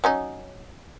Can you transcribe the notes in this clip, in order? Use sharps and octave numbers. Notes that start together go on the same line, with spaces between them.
F#3 C#4 D#4